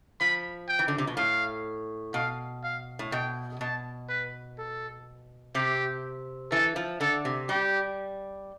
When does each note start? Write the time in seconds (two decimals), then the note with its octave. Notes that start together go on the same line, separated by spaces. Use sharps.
0.21 F3 B5
0.68 G5
0.79 E3
0.88 D3
0.98 C3
1.07 B2
1.17 A2 F5
2.14 B2 F5
2.64 F5
2.99 A2
3.12 B2 G5
3.61 B2 A5
4.09 B4
4.58 A4
5.55 C3 G4
6.51 E3 A4
6.76 F3
7.01 D3 A4
7.25 C3
7.49 G3 G4